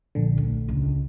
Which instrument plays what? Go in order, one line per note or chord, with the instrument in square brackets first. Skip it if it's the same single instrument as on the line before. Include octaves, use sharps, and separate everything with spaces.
[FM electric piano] A#1 D3
[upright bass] D2
C#2